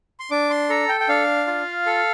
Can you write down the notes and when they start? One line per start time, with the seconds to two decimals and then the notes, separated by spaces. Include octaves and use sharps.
0.20 C6
0.31 D4 D6
0.50 C6
0.70 A4 A#5
0.89 G5
1.00 G5
1.09 D4 F5
1.47 F4
1.86 A4